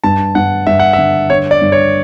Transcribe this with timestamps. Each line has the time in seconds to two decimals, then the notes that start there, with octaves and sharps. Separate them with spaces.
0.04 G2 A5
0.35 G2 F#5
0.67 G2 E5
0.79 F#5
0.93 D3 E5
1.30 D3 C#5
1.51 D5
1.62 G2
1.72 C#5